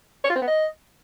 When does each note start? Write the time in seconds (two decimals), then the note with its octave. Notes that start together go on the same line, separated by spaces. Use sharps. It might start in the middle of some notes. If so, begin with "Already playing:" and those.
0.24 C#5
0.30 F4
0.36 C4
0.42 B3
0.47 D#5